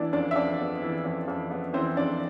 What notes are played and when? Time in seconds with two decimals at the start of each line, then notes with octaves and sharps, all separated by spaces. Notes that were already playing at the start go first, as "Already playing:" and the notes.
Already playing: E3 B3 D4 E4 D5
0.13 F2 D4 D5
0.31 E5
0.36 F2 D4 D5
0.59 B3
0.82 E3
1.05 F2
1.28 F2
1.51 B3
1.74 E3 C4 C5
1.97 F2 D4 D5